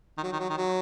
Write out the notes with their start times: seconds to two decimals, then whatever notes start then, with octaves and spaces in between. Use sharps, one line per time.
0.18 D#3
0.23 F#3
0.32 D#3
0.39 F#3
0.49 D#3
0.57 F#3